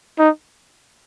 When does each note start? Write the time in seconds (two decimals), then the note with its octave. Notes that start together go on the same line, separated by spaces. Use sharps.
0.19 D#4